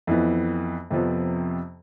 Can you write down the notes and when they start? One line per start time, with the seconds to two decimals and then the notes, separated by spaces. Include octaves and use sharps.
0.07 F2 E3 B3
0.90 F2 C3 F3 B3